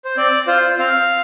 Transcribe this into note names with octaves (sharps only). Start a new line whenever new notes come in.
C5
C4 D5
F4 C5
C4 F5